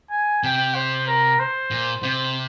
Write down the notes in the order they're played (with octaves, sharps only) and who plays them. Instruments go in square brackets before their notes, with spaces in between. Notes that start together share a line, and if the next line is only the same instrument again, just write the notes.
[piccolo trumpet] G#5
[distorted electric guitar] C3 [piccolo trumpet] G5
[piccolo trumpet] C5
A#4
C5
[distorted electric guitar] A#2
[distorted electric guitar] C3 [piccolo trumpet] C5